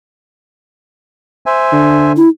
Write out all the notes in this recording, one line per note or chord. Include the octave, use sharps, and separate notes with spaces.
C5 E5 G#5
D3
E4